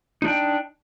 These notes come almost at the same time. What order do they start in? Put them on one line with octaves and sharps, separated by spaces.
D#4 D4 G5